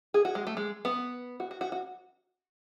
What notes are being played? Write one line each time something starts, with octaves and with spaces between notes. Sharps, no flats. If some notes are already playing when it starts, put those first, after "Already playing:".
G#4
F#4
G#3
A3
G#3
B3
F#4
F#4
F#4
F#4